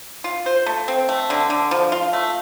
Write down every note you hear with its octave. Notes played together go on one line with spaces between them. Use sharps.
F4
C5
A3
C4
A3
D3
D3
F3
F4
A3